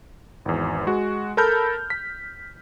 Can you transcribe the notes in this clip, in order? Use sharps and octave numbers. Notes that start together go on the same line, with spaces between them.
G#1 E2
G#3 F#4
A4 A#4 A5 B5 F6 G6
B6